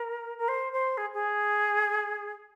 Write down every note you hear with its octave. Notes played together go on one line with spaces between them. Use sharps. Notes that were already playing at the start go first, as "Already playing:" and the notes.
Already playing: A#4
A#4
C5
C5
G#4
G#4